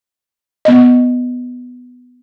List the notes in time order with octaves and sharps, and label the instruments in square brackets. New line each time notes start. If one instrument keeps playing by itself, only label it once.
[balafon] B3 D#5